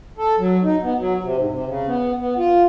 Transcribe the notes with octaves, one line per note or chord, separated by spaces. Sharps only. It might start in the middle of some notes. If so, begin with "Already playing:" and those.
A4
F#3
D#4
B3
F#3
C3
G#2
C3
C#3
B3
B3
F4